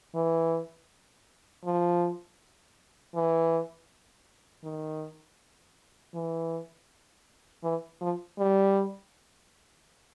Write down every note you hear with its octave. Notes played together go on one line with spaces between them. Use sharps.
E3
F3
E3
D#3
E3
E3
F3
G3